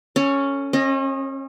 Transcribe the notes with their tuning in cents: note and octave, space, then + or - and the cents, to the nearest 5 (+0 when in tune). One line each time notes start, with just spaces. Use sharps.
C#4 +0 A4 +35
C#4 -40 D#5 +0